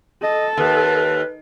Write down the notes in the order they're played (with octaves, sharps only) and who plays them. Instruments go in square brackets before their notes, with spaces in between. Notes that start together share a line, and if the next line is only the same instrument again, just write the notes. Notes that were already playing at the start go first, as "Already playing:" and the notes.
[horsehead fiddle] A4 [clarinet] D#5
[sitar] D#2 [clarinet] B4